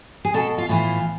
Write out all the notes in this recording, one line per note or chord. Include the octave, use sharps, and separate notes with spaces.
G#4
B2 A4
F4
A2 E3 F4